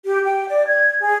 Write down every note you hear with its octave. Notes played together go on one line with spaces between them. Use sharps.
G4
G5
D5
G#6
G#4